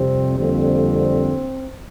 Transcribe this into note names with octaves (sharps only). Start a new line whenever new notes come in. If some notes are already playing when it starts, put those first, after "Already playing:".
Already playing: F2 C3 G3 C4
F2 D3 G3 A#3 C4